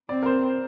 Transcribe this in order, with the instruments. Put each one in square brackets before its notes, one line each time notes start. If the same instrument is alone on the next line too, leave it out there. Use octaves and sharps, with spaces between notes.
[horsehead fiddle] C4 [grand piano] D5
[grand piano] A#4
C5